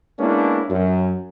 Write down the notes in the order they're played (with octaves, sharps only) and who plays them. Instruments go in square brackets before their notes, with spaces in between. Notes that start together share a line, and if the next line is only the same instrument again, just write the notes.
[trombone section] G#3 A#3 B3 C#4 D4 E4
F#2